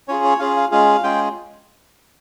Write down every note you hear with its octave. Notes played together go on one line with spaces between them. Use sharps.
C#4 F4 G#4 C#5
C#5
C#4 F4 G#4 F5
F5
G#3 C#4 F4 G#4 F5
G#3 C#4 F4 G#4 G5